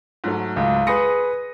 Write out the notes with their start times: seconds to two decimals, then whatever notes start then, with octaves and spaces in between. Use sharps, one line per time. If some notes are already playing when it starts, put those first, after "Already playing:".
0.24 G#2 F#3 A3
0.56 C#2
0.87 G#4 B4 C6 D#6 A#6 C#7